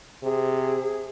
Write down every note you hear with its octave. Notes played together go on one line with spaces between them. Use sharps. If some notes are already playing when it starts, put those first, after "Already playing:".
C3 G#4